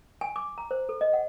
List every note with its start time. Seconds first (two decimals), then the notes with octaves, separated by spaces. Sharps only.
0.21 G#5
0.36 D6
0.58 A#5
0.71 C5
0.89 A4
1.01 D#5
1.13 F#5